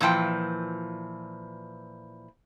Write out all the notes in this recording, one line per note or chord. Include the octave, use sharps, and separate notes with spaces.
A#2 E3 F3 G5